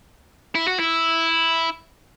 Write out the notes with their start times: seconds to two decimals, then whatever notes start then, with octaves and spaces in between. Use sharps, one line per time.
0.55 E4
0.68 F#4
0.79 E4